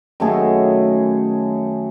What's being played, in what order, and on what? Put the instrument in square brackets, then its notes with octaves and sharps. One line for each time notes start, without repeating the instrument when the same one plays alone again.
[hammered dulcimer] F#2 D#3 A3 G#4